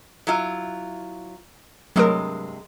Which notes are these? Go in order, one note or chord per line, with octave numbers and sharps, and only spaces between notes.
F#3 E4 F4
G2 C3 F#3 G#3 A3 A#4